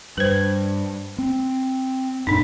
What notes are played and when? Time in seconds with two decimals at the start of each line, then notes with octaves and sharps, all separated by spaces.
0.18 G2 B4 C5
1.18 C4
2.27 F#2 A#2 D4 D#4